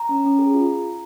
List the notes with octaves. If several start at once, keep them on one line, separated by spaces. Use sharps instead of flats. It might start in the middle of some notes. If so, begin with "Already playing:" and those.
Already playing: A#5
C#4
C#4
G#4
F4